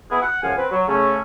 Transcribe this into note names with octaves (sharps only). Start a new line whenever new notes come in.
B3 E4 G#4
F#5
C#2 F#2 F3 F5 F#5 G#5
C4 B4
F#3
C#3 A3 C#4